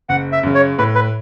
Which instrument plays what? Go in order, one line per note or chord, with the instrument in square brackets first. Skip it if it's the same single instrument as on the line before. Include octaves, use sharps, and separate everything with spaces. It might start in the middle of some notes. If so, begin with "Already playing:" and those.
[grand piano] F#1 [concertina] F#5
[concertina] E5
[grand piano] F#2 C#3
[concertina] C#5
[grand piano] A2 [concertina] B4
[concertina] B4